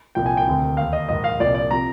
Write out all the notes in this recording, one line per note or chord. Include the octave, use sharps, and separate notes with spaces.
C2 A#2 F3 G5
G#5
G5
D2 C3 D#3
D#2 D#3 F5
D#5
A#1 G#2 D#3 D#5
F5
C2 A#2 F3 D5
D5
C3 F3 A#5